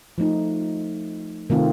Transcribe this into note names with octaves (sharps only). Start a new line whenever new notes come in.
F3 A3 D#4
C3 D#3 A3 C4 F4